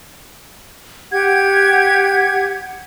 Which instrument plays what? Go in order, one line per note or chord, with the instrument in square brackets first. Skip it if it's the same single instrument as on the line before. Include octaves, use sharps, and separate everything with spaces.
[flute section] G4 F#5 G#6